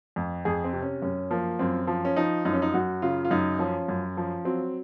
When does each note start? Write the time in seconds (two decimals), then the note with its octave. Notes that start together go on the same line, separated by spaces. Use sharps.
0.16 F2
0.45 F2 G#4
0.64 C4
0.73 C3
0.82 C#4
1.02 F#2 C#4
1.31 F3 A#3
1.59 F#2 C4
1.87 F3
2.05 C#4
2.16 F3 D#4
2.45 F#2 D#4
2.53 C#4
2.62 D#4
2.74 F#2 F#4
3.02 C#3 F4
3.25 F4
3.31 F#2 D#4
3.59 F3 C#4
3.88 F#2
4.17 F3
4.45 F#3 C4